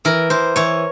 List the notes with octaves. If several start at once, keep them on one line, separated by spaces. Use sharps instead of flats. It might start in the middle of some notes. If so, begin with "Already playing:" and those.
E3 A#4
E3 C5
E3 C#5